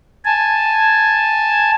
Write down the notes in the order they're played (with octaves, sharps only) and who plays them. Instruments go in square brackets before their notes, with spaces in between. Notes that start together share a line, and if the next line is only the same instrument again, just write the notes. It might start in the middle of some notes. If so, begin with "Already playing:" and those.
[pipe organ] G#5 A5